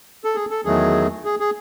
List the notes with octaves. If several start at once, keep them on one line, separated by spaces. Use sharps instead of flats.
A4
G#4
A4
E2 D#3 F#3 A3 G#4
G#4
G#4